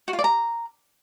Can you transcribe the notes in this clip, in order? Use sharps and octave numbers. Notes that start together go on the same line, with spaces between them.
F#4
F4
D5
A#5